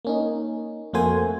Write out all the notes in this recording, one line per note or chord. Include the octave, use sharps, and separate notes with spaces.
A#3 C#4 D#4
F2 A3 A#3 F#4 C5 G#5